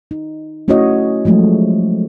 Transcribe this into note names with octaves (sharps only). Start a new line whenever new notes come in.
D#4
A3 C#4 E4 F#4 C#5 D#5
F3 F#3 G#3 A3